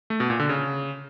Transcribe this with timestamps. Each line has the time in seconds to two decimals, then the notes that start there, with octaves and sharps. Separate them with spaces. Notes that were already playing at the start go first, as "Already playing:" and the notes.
0.10 A3
0.20 B2
0.30 A#2
0.39 D3
0.49 C#3